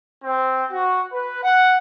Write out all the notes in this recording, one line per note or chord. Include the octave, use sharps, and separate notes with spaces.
C4
F#4
B4
F#5